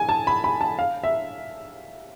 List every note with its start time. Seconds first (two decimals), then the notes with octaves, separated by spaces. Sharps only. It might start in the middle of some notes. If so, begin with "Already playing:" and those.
Already playing: G#5
0.09 A5
0.27 B5
0.44 B5
0.61 A5
0.79 F5
1.04 E5